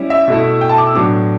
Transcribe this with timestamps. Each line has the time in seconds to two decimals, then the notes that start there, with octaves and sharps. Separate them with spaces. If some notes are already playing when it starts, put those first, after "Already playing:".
Already playing: G3 C#4 E4
0.10 E5
0.28 B2 A3 E4
0.61 G5
0.69 A5
0.78 D6
0.87 E6
0.95 A2 F#3 B3 D4 D6